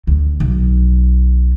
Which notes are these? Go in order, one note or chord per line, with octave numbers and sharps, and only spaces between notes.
D2
B1